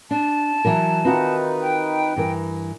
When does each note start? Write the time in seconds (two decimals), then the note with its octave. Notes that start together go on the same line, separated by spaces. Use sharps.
0.11 D4 A5
0.65 E3 F#3 A#4
1.05 D#3 C4 D#4 F4 F#4 B4
1.61 G5
2.16 G2 E3 A#4